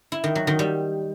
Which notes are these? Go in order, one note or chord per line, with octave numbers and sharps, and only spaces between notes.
E4
D#3
F#3
D#3
G3